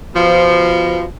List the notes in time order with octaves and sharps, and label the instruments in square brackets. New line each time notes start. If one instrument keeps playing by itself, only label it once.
[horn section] B2 F3